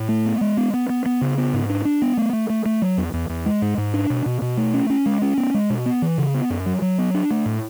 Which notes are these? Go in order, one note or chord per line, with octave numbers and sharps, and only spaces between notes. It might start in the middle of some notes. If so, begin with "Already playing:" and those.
Already playing: A2
A3
B3
G#3
B3
B3
B3
B3
C#3
B3
G#2
D4
D4
B3
A3
A3
A3
A3
F#3
E2
E2
E2
G#3
G#2
G#2
D4
B2
B2
B2
A3
C#4
C#4
G#3
C#4
B3
G#3
B2
B3
E3
C#3
B3
F#2
F#3
F#3
B3
D4
A3
A2